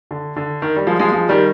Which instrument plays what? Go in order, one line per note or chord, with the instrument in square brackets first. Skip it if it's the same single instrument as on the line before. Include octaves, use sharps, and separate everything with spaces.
[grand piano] D3
D3
D#3
G3
F3 G#3
F3 G#3
F3 G#3
D#3 G3